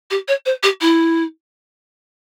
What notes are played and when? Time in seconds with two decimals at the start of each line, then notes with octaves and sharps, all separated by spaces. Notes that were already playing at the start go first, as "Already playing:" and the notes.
0.10 G4
0.28 C#5
0.45 C5
0.63 G4
0.81 E4